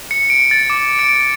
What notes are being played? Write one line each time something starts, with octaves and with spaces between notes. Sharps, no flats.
C#7
D7
A6
D6
D7